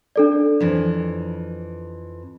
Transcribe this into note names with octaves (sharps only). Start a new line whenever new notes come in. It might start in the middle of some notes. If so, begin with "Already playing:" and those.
D4 A4 D5
F2 E3